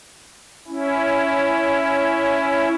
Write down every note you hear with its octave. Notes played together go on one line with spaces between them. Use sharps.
C#4 E4